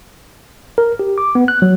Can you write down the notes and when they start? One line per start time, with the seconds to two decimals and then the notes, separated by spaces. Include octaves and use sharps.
0.78 A#4
0.99 G4
1.18 D6
1.35 B3
1.48 F#6
1.62 F#3